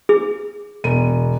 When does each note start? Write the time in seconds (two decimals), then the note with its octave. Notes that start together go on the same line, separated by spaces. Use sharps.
0.09 G#4
0.84 E1 D#7